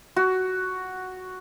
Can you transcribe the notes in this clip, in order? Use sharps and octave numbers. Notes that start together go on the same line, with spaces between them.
F#4